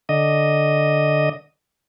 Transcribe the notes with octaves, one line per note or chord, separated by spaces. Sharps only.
D3 D#5